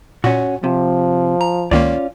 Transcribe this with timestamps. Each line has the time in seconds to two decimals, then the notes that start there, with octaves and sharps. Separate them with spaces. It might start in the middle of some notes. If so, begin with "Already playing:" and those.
0.24 A#2 C#4 F#4
0.64 C3 F3
1.41 A#5
1.71 C#2 D#3 A#3 C#4 F4 D5